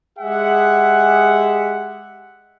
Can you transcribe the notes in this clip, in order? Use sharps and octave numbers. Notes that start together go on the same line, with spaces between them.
G#3 G4 G#4 E5 F#5